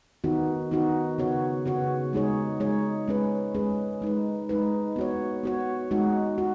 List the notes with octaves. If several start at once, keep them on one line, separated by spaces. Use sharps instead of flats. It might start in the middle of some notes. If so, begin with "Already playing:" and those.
D#3 B3 D#4 F#4
D#3 B3 D#4 F#4
C#3 B3 F#4 C#5
C#3 B3 F#4 C#5
G#3 D#4 G#4 C#5
G#3 D#4 G#4 C#5
G#3 C#4 G#4 B4
G#3 C#4 G#4 B4
G#3 D#4 B4
G#3 D#4 B4
B3 F#4 C#5
B3 F#4 C#5
G#3 D#4 F#4
F#4